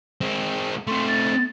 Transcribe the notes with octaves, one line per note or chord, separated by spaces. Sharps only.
G#3 C4
A3 C4 C6
A6